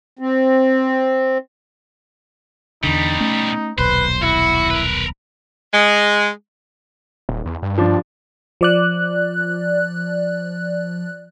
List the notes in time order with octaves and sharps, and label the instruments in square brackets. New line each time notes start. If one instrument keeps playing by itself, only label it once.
[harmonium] C4
[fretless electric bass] E2 D3 [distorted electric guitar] B2 G3 [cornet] D#4
[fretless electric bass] A3 C#4
[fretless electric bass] D#1 B1 [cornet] B4 [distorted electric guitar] C5
[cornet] E4 [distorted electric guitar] F#4
[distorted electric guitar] A#4 B4
[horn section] G#3
[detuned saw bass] D#1
E2
G2
[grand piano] F3 D4
[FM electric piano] F3 D5 F#6